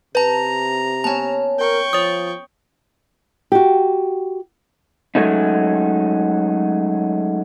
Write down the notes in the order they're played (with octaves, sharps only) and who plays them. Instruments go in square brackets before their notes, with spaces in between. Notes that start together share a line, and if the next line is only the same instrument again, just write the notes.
[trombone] C3 [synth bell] B4 A5 [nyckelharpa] A#5
[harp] B3 C#4 [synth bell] G#5 A5
[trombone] A#4 [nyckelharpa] G5 C#6
[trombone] F3 [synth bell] C#5 D#6
[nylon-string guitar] F#4 G4
[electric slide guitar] F#3 G#3 A3 C#4 D#4